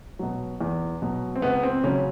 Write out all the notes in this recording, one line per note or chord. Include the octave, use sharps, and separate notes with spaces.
B2 F#3
E2
B2 F#3
C4
C#2 B3
C4
C#3 F#3 C#4